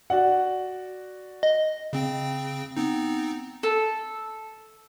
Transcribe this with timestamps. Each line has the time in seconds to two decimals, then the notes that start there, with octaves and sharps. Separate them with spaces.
0.10 F#4 D5 F#5
1.43 D#5
1.93 C#3 C4 G5
2.77 B3 C4 D#4
3.63 A4